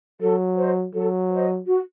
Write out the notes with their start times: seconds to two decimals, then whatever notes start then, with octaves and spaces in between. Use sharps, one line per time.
0.21 F#3 A4
0.57 C5 D#5
0.94 F#3 A4
1.31 C5 D#5
1.67 F#4